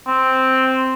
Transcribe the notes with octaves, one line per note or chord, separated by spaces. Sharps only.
C4